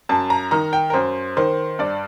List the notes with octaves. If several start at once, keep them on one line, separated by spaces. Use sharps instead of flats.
F#2 A5
A#5
D#3 A#5
G5
A#4
F#2 C5
D#3 C5
G2 D5